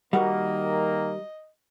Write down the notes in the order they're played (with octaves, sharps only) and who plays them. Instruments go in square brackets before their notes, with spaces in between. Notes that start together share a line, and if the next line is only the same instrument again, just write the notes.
[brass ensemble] D#3 A#3 [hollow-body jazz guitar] G3 [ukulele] F#4 A#4 F#5 [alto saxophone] D#5